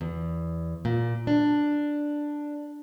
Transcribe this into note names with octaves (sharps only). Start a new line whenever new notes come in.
E2
A#2
D4